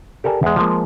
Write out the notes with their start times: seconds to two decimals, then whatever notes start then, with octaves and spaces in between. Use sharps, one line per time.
0.24 G4 A4 A#4 D5 G#5 A5
0.43 E2 G#3
0.56 F3 G#3 A#3